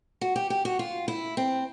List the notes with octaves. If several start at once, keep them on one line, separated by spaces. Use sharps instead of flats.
F#4
G4
G4
F#4
F4
E4
C4